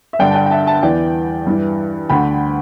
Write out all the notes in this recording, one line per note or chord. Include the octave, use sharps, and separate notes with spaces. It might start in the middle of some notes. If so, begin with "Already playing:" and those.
E5
G2 D3 D5 G5
A5
D5 G5
G5
E5 A5
E5 A5
E2 E3 D5 G5
G2 E3
D2 D3 G5 B5